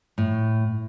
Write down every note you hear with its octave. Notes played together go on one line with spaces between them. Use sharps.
A2